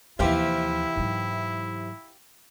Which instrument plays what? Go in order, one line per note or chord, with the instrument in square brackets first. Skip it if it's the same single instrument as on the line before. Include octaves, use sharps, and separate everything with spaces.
[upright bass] D#2 F3 [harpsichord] C3 E3 [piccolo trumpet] E4 [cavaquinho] G4 C5 F5
[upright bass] G#2 F#3